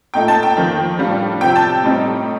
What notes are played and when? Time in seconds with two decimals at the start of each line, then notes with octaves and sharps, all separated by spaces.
0.14 A#2 A3 D#4 G5
0.28 A5
0.43 G5
0.57 F2 D#3 A#3
0.99 A2 G3 D4 F4
1.41 C3 F3 C4 G5
1.56 A5
1.84 A2 G3 C4 D#4